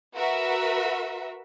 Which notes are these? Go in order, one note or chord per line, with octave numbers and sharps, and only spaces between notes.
F#4 A#4 B4 E5